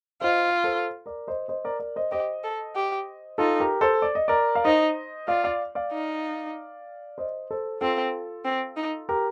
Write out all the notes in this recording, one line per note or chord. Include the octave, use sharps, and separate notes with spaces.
F4 C5 D#5
A4 C5
A#4 D5
C5 D#5
C5 D#5
A#4 D5
A#4 D5
C5 D#5
G4 C5 D#5
A4
G4
D#4 F4 A4
G4 A#4
A4 C5
D5
D#5
A#4 D5
F5
D#4 C5 D#5
F4 D5 F5
D5 F5
D5 F5
D#4
C5 D#5
A4 C5
C4 F4 A4
C4
D#4
G4 A#4